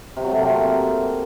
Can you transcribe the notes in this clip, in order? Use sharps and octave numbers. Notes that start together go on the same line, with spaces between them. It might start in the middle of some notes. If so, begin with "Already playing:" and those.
C3
F#3
A3
A#3
C4